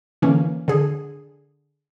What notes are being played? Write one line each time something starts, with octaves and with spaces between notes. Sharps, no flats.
D3 E3 A#3 C#4
D3 G#4